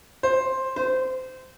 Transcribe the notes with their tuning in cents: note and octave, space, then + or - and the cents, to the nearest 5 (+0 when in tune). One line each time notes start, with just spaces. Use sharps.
C5 +10
C5 -20